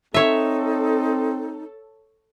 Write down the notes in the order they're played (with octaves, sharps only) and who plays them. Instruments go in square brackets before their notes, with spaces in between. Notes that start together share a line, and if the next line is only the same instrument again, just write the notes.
[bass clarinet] C4 [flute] D#4 [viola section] A4 [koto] C#5 E5